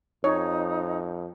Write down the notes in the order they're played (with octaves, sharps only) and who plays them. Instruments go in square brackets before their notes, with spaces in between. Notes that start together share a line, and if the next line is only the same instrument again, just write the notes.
[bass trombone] F2 [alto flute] D#4 [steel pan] C#5